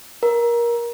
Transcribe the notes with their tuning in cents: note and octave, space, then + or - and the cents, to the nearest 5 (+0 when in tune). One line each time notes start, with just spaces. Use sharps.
A#4 +20